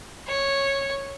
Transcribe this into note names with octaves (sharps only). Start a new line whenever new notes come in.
C#5